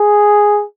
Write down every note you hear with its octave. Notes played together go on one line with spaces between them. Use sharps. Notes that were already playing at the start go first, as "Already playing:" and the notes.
Already playing: G#4